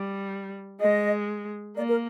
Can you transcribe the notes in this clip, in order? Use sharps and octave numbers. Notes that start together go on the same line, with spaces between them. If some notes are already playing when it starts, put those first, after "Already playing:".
Already playing: G3
G#3 D#5
A#3 D5
A#4